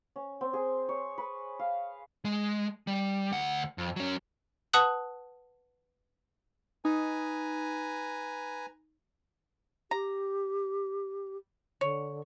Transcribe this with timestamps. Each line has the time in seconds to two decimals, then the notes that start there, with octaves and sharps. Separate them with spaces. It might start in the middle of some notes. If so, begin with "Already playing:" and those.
0.16 C#4
0.41 C4
0.53 G#4
0.89 C#5
1.18 B4
1.59 F5
2.25 G#3
2.87 G3
3.32 D2 F#5
3.78 F2
3.96 F#3 C#4
4.73 B4 F#5 A5 D#6 F#6 F#7
6.85 D#4 B4 G#5 A#5
9.91 G4 A#5
11.81 D3 C#5